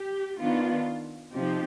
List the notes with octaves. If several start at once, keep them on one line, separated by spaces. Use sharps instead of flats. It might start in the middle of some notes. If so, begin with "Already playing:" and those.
Already playing: G4
D#3 B3 D4 F4
C3 F3 C4 D#4 G4